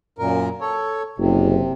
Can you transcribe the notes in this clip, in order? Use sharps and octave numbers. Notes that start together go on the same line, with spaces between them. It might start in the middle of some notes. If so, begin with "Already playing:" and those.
F#2 A#2 A#4
A4 C#5
F#1 C3